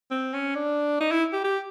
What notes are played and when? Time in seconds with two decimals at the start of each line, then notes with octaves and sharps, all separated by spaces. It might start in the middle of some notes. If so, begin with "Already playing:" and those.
0.11 C4
0.34 C#4
0.55 D4
1.00 D#4
1.11 E4
1.33 G4
1.44 G4